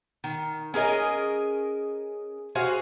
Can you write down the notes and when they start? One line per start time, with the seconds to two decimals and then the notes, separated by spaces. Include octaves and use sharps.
0.24 D#3
0.74 C#4 G#4 A#4 D#5
2.55 F#4 G#4 C5 F5